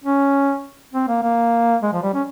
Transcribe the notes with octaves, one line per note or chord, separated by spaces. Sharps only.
C#4
C4
A#3
A#3
G#3
F3
G3
C#4